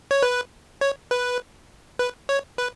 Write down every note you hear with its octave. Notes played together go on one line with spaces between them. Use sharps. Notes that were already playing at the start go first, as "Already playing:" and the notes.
C#5
B4
C#5
B4
B4
C#5
B4